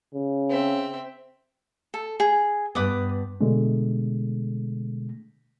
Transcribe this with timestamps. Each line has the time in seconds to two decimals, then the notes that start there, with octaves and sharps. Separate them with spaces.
0.14 C#3
0.49 C4 E5
1.94 A4
2.20 G#4
2.75 G2 B3 B4 D6 D#6
3.40 B2 D3 G#3 A3